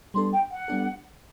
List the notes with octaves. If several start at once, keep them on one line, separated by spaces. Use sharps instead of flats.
G3 B3 D4 A4 C6
G5
F#5
G3 B3 D4 A4